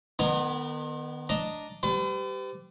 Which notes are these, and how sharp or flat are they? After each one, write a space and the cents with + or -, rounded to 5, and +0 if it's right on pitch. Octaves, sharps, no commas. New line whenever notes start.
D#3 -35 B3 +0 A#5 +0
D4 +0 D#5 +0 A#5 +0
G3 -10 B4 +45